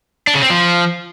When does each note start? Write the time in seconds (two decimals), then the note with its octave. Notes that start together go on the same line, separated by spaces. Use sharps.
0.27 D4
0.35 C#3
0.42 C4
0.50 F3